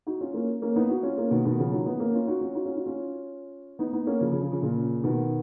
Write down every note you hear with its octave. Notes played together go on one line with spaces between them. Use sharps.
D#4 F#4
C#4 F4
A#3 C#4
A#3 C#4
B3 D#4
D#4 F#4
C#4 F4
A#3 C#4
B2 D#3
B2 D#3
C#3 F3
D#3 F#3
B3 D#4
A#3 C#4
C#4 F4
D#4 F#4
C#4 F4
D#4 F#4
C#4 F4
D#4 F#4
C#4 F4
B3 D#4
B3 D#4
A#3 C#4
C#3 F3
C#3 F3
C#3 F3
C#3 F3
A#2 C#3
B2 D#3